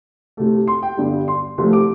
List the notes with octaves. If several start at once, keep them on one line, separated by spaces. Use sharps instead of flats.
C2 C3 A3
C6
G5
G1 G2 D3 G3
C6
C2 C3 F3 A3 C6
D6